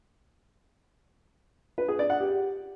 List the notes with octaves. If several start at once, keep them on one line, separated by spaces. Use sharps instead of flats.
B4
G#4
D5
F#5
G4